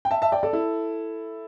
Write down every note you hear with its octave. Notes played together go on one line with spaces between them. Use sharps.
G5
E5 A5
E5 A5
D5 G5
A4 D5
E4 A4